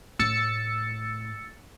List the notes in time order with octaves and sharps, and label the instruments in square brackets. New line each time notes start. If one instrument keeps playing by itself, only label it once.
[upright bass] A2 [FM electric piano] E6 A6 C#7